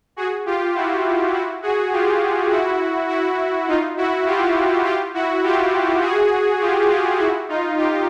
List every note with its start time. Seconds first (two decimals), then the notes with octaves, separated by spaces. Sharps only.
0.16 F#4 G#4
0.46 F4 G4
0.75 E4 F#4
1.34 E4 F#4
1.62 F#4 G#4
1.92 F4 G4
2.51 E4 F#4
3.09 E4 F#4
3.68 D#4 F4
3.97 E4 F#4
4.26 F4 G4
4.85 F4 G4
5.14 E4 F#4
5.43 F4 G4
6.02 F#4 G#4
6.61 F4 G4
6.90 F4 G4
7.19 E4 F#4
7.49 D#4 F4
7.78 F4 G4